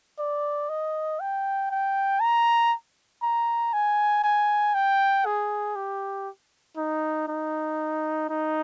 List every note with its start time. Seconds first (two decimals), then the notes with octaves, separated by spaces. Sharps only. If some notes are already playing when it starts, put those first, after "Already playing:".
0.19 D5
0.69 D#5
1.20 G5
1.71 G5
2.20 A#5
3.22 A#5
3.73 G#5
4.24 G#5
4.74 G5
5.26 G#4
5.75 G4
6.77 D#4
7.28 D#4
8.29 D#4